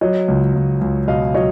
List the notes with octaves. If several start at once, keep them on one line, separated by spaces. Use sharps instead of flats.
F#3 C#5 D#5
C#2
C#2
C#2
B2 D#5 F5
F#3 C#5 D#5